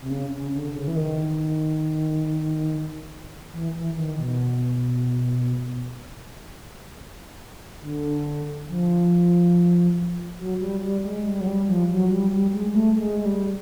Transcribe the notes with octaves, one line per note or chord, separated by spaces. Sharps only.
C3
C#3
C#3
D3
C#3
E3
D#3
E3
E3
D#3
B2
D3
F3
F#3
G3
G3
G#3
G3
F#3
G3
F3
F#3
G3
G3
G#3
G#3
A3
G#3
G#3
G3